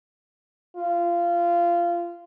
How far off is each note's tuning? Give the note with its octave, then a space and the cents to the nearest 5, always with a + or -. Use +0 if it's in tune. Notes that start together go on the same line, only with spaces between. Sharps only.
F4 -20